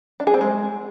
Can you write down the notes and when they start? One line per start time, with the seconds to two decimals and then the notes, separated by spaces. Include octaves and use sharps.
0.20 D4
0.27 G#4
0.34 C4
0.41 G#3